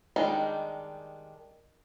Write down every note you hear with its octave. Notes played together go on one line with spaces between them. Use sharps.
D#3 G3 G#3 D4 D#4